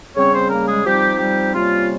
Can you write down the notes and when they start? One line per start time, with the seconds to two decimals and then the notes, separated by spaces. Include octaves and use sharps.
0.17 C#3 G3 C4 C#4 C#5
0.34 C4 C5
0.50 A#3 A#4
0.68 G#3 G#4
0.85 F3 G3 C4 D#4 G4
1.19 G3 G4
1.54 C3 G3 A#3 C#4 F4